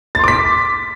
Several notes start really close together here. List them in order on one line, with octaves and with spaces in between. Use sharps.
A6 C6 D6 B6